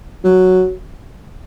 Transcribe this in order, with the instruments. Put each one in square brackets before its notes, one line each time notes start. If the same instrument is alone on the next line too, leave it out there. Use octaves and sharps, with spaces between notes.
[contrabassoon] F#3